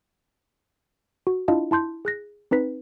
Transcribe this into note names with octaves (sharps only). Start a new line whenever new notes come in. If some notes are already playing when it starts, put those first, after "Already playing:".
F#4
D4 E4 F4 D#5 F5 A5
E4 A5 C6 G6
G#4 F#6 A#6
C4 D#4 B4 B6